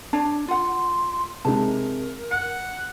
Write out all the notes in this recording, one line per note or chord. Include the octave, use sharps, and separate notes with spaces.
D4 C#5 A5
F4 F#5 C6
C3 G#3 D#4 A#4 A5
F#5 C#7